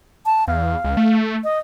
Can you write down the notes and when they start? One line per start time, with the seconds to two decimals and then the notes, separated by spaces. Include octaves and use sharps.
0.26 A5
0.48 E2 F5
0.84 C#2
0.97 A3
1.44 D#5